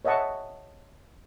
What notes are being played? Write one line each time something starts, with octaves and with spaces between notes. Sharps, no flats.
C#5 D#5 E5 F#5 A5 C#6